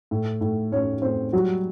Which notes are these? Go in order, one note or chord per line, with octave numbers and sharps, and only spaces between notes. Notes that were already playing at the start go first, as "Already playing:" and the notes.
A2
A2
A2 C#4 C#5
A2 C4 C5
F#3 G3 F#4